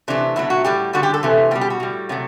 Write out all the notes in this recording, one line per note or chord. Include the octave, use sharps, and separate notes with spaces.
C3 E3 A3 D4
B2 F#3 A3 E4
F#4
A2 G3 G4
D3 G3 F#4
G4
A4
C3 E3 A3
B2 G3 G4
G4
F#4
A2 G3
C3 F#3 A3